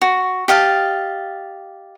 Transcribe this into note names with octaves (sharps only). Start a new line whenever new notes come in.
F#4
G4 D#5 F5 A5